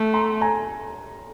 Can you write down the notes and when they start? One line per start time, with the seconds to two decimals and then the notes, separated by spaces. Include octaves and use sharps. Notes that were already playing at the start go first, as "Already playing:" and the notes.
Already playing: A3
0.14 A#5 C6
0.41 G#5 A#5